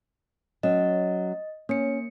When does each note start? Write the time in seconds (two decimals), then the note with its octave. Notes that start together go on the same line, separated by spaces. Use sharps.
0.63 F#3 C#4 D#5
1.69 A#3 C#4 C#7